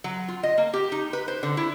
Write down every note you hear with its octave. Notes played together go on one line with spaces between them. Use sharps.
F#3
F4
D#5
A#3
G4
D#4
B4
C5
D3
E4